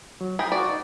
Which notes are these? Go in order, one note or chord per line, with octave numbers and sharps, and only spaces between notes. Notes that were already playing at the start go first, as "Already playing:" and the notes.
F#3
G#4 G5 A#5 B5
F4 F#4 D5 C#6
D#4